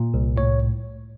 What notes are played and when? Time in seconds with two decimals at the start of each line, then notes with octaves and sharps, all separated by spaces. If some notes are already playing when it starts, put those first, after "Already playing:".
Already playing: A#2
0.14 C2
0.36 A2 C#5